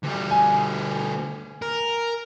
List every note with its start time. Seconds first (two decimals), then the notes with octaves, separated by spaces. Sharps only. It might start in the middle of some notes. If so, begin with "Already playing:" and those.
0.03 D2 G3
0.31 G#5
1.62 A#4